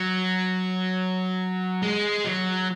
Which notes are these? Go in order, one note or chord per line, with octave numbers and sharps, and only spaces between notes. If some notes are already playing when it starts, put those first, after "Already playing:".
Already playing: F#3
G#3
F#3